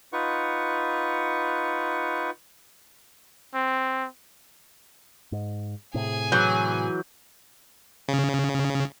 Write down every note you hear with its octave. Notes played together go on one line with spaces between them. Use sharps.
D#4 F4 B4 F#5 C#6
C4
G#2
A2 C3 G#4 G#5
E3 F#3 F#6 G6
C#3